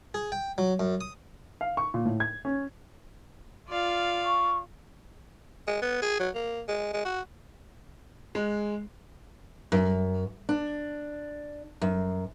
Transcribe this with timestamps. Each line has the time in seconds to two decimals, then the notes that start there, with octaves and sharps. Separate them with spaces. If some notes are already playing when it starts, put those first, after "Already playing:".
0.14 G#4
0.32 G5
0.58 F#3
0.80 F#2
1.01 D#6
1.61 F5
1.77 C#6
1.94 A#2
2.05 A2
2.20 G#6
2.45 C#4
3.69 F4 D5 F5
4.24 C#6
5.67 G#3
5.82 B3
6.02 G#4
6.20 F#3
6.35 A#3
6.68 G#3
6.94 G#3
7.05 F#4
8.35 G#3
9.72 F#2
10.49 D4
11.82 F#2